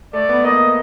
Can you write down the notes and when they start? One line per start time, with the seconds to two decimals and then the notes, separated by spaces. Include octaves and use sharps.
0.13 A3 D5
0.29 B3
0.44 A#3 D#5